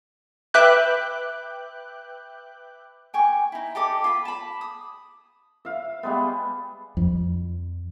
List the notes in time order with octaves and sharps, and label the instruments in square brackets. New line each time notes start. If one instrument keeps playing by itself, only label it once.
[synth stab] B4 E5 G5 D6 F#6 G6
[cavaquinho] G5 G#5 C#6
D#4 E4
G4 A4 D#5 D6
F4 B5
A5 B5
D#6
[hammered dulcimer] E5 F5
G3 G#3 B3
[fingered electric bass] F2